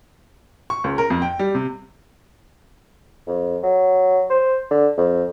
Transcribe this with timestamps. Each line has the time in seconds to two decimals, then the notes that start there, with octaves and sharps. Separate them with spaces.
0.70 C#6
0.84 C#2
0.98 A#4
1.10 F2
1.22 G5
1.39 G3
1.55 C3
3.27 F2
3.63 F#3
4.30 C5
4.71 D3
4.98 F2